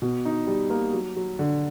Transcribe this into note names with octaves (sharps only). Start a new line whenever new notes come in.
B2
D#4
G3
A#3
F#3
F#3
D3